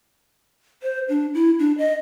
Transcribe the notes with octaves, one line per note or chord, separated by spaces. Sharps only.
C5
D4
E4
D4
D#5